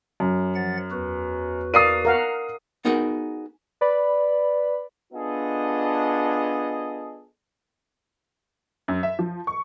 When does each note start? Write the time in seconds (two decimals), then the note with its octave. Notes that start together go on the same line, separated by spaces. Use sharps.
0.20 F#2
0.55 F3 F#5 A6
0.91 E2 F#4 B4
1.74 A#4 D5 F5 D#6 C7 D#7
2.05 A#4 F5 F#5
2.85 B3 D#4 F#4 G#4 A#4 F#5
3.81 B4 D5 B5
5.13 B3 D4 F4 G#4 A4 D#5
8.88 F#2
9.03 E5
9.19 F3
9.47 C#6